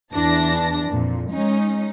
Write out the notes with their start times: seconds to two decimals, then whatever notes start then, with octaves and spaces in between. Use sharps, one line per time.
0.14 E2 E3 D4 A5 A#6
0.89 F2 A#2
1.30 G#3 C#4 D#4